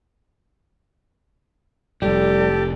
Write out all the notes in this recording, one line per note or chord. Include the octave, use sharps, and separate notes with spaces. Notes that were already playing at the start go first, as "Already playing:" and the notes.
F1 A2 G3 G4 A4